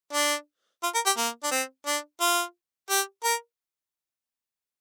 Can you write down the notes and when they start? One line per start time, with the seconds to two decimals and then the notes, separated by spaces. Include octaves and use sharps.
0.13 D4
0.83 F4
0.95 A#4
1.06 G4
1.18 A#3
1.43 D4
1.51 C4
1.86 D4
2.21 F4
2.90 G4
3.24 A#4